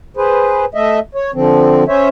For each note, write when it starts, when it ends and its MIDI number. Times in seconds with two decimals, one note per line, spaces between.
0.17 0.65 68
0.17 0.65 71
0.17 0.65 72
0.74 0.99 57
0.74 0.99 75
0.74 0.99 76
1.15 1.31 73
1.34 1.84 50
1.34 1.84 53
1.34 1.84 60
1.88 2.09 61
1.88 2.09 72
1.88 2.09 73
1.88 2.09 76